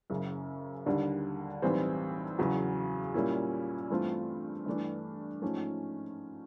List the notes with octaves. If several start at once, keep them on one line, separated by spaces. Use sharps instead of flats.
F#1 F#2 C#3
D#2 D3 G3
B1 A2 E3 G3 C4
E2 C#3 F#3
A#2 G3 A#3 C#4 E4
G2 E3 A3 C4 F4
G2 E3 A3 D4
G#2 F3 A3 C#4